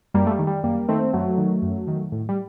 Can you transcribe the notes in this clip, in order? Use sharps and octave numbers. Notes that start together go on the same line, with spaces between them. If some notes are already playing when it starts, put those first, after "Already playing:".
F#2 G3 A#3
A3
G3
D#3
G3
F#2 G3 A#3
D#3 A3 C4
F#2 F#3 A3
D#3
F#2
D#3
A2
G3